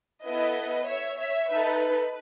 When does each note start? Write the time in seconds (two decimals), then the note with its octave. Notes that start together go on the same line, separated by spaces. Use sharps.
0.24 B3 E4 A4 B4 D#5
0.87 C#5 E5
1.19 C#5 E5
1.50 D#4 A4 B4